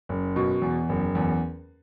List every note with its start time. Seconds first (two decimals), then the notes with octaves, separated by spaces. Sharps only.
0.09 F#1
0.36 B2
0.62 E2
0.89 F#1
1.15 E2